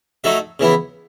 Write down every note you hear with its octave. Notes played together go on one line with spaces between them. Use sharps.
F#3 A3 D#4 A4 E5
C#3 E3 B3 E4